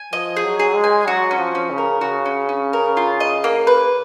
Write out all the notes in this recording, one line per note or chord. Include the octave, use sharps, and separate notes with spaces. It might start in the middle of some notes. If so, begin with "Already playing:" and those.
Already playing: G#5
F3 D#5
G#4
F#3
G#4
G#3
G#5
F#3 F#4
C#4
F3
C#4
C#3
A#4
C#3 F#4
C#4
C#4
A#4
F4
D#5
A#3
B4